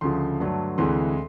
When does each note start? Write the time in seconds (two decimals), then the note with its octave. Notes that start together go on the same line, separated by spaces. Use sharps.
0.01 D2 C#3 F3 C6
0.40 G2 D3 F#3 A3
0.78 D2 C3 E3 G#3 C6